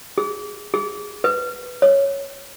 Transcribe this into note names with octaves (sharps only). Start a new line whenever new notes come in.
G#4
G#4
B4
C#5